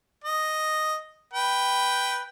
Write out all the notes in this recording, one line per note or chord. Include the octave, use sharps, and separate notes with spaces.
D#5
B4 G5